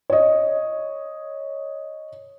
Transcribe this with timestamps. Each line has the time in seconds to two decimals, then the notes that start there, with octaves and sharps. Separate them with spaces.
0.10 C#5 D#5